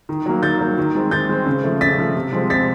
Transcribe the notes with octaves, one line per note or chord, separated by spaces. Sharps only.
D#3
F#3 A#3
D#3 G6 A6
F#3 A#3
D#3
G#3 C4
D#3 G6 A6
G#3 C4
C#3
F3 A3
C#3 A6 B6
F3 A3
C3
F3 G#3 C4
C3 A6 B6